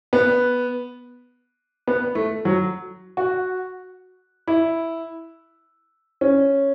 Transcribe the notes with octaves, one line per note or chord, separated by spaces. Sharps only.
B3
B3
A3
F#3
F#4
E4
C#4